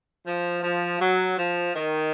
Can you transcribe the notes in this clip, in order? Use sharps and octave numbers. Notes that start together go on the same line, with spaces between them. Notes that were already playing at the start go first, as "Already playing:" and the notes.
F3
F3
F#3
F3
D#3